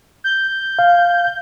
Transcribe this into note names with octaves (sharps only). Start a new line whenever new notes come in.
G6
F5